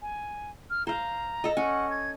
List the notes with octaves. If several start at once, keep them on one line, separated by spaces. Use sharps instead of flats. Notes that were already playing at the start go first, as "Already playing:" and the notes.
G#5
F6
C5 F5 A#5
A4 D#5
C#4 F#5
G#6